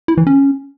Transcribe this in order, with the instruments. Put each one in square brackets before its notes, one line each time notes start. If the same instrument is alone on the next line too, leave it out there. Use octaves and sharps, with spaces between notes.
[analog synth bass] E4
E3
C#4